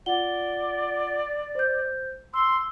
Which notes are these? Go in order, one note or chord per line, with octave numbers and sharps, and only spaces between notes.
F4 D5 F#5 G7
C5 G6
C6 E6